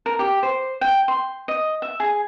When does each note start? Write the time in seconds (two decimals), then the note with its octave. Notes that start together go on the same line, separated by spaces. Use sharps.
0.06 A#4
0.19 G4
0.43 C5
0.81 G5
1.08 C6
1.48 D#5
1.82 E5
2.00 G#4